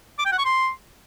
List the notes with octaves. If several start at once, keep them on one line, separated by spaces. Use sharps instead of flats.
D6
G5
F#5
C#6
C6